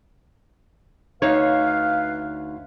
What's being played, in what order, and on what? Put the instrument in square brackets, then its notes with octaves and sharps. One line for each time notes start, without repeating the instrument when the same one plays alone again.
[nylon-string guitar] D2 D#4 C#5 [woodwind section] B4 F5